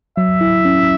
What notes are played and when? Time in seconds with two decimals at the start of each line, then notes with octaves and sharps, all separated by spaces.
0.17 F#3 E5
0.41 E4
0.65 C#4